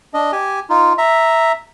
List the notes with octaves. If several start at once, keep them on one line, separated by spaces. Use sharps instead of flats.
D4 D#5
G4 G#5
D#4 F4
E5 A#5